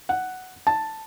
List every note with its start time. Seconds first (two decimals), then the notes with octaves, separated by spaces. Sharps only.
0.09 F#5
0.67 A5